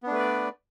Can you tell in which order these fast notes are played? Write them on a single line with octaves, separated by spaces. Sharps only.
B3 D4 A3 B4 D5